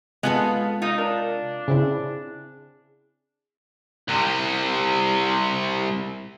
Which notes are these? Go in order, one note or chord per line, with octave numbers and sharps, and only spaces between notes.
C3 G#3 B3 F4 A4 D#5 G#5 F#6
D#4 F4
D4 A#4
C#3 C4 E4 G#4
C2 C3